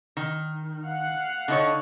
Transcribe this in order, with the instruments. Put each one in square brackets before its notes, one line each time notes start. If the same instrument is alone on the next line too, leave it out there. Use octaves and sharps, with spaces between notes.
[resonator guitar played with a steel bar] D#3
[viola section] F5 F#5
[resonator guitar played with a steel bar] D3 D#4 C#5